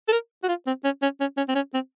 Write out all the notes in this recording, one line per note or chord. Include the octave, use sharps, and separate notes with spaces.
A4
A#4
F#4
F4
C4
C#4
C#4
C#4
C#4
C4
C#4
C4